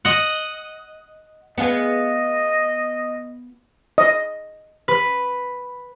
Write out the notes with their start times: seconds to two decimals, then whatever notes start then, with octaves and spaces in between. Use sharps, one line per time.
0.05 D#5 F#5
1.58 B3 F4 G#4 D#5
3.98 D#5
4.88 B4